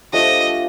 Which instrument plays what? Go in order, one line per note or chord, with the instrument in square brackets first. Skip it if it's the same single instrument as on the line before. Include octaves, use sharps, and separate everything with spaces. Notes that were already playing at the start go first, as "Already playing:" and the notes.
[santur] F3 A3 D4 G4 [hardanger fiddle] D#5